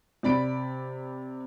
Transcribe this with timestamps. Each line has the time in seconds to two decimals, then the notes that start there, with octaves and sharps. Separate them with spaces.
0.23 C3 D5 B5 D7